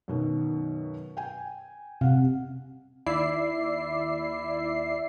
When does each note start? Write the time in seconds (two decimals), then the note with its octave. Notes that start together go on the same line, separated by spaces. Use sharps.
0.08 F#2 B2 D#3
1.17 G5 G#5
2.01 C3 F5 F#5
3.06 D#2 E4 D5 E5 C7